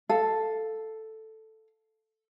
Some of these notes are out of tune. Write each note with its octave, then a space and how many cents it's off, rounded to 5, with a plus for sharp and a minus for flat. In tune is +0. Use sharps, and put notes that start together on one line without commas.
A4 +0 F5 +0